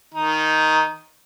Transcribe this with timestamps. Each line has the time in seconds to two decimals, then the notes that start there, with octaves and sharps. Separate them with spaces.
0.14 D#3 D#4